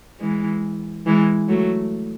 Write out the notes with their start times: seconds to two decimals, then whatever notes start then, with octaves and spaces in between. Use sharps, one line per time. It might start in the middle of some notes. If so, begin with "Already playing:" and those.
0.19 E3 G#3
1.06 E3 G#3
1.49 F#3 A3